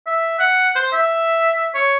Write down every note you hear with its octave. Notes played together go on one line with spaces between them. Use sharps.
E5
F#5
C5
E5
C#5